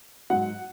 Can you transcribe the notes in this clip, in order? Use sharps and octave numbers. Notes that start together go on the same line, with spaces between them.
G#2 F#3 F#5